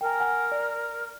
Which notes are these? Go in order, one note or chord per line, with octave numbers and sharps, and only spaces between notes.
A#4 G5 G#5
F#5 G#5
D5